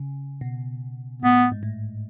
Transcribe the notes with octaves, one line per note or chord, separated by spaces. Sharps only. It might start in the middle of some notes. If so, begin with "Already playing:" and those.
Already playing: C#3
B2
A2 B3
G#2
A2